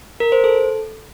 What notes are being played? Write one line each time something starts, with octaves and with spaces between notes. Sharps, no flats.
A#4
C5
A4